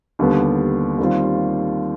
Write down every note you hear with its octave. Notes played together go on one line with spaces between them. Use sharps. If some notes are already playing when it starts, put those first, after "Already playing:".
D#2 D3 G3 B3
D#2 D#3 G3 C4 F4